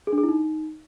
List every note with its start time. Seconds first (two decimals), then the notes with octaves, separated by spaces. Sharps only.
0.07 G#4
0.13 D4
0.18 G#4
0.23 E4
0.29 D#4